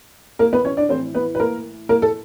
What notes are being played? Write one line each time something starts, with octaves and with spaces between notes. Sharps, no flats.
A#3 A#4
B3 B4
C#4 C#5
D4 D5
A2 E3 C4 C5
B3 B4
B4
A#3 A#4
A#3 A#4
A4